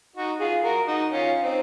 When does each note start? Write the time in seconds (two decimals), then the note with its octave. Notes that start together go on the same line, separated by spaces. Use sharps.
0.16 D#4 F#4
0.40 F4 G#4
0.64 F#4 A#4
0.87 D#4 F#4
1.11 C#4 F4
1.43 C4 D#4